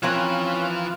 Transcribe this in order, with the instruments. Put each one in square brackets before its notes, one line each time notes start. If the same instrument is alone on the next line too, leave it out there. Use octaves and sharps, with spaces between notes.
[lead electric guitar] E3 B4 [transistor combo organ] F3 F4 [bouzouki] C4 A#4 G#5 [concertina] C#4